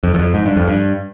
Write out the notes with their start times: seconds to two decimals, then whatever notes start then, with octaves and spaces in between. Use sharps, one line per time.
0.03 F2
0.14 E2
0.19 F2
0.34 G#2
0.46 G2
0.56 F2
0.68 G2